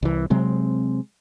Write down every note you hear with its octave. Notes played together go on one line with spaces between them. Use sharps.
C2 E3
C3 F#3 G#3 C4